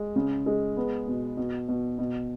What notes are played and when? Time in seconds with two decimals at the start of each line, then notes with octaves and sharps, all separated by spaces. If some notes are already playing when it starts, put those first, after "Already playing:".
Already playing: G#3
0.16 C#3
0.46 G#3
0.77 B3
1.07 B2
1.37 B2
1.68 B2
1.99 B2